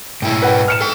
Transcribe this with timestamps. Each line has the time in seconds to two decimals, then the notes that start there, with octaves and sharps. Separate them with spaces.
0.22 G#2 E4 G5
0.42 B4 F#5 G5
0.68 F6 C#7 E7
0.81 A4 G5